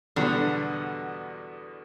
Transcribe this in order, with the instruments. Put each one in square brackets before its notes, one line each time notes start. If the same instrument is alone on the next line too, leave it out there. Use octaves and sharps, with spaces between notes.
[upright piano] E2 B2 G3 B3 [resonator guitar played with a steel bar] D3